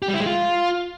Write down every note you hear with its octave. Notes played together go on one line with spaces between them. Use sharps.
G4
G3
E4
G#3
F4